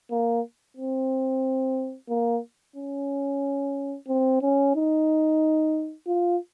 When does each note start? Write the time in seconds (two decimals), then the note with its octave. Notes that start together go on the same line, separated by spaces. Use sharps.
0.11 A#3
0.76 C4
2.09 A#3
2.76 C#4
4.08 C4
4.42 C#4
4.75 D#4
6.07 F4